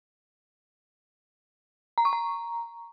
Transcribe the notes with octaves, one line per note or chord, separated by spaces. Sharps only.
A#5
C#6
A#5